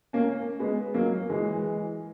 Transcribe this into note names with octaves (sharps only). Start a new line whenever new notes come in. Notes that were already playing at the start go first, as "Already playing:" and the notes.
A#3 C#4
G#3 B3
F#3 A#3
E3 G#3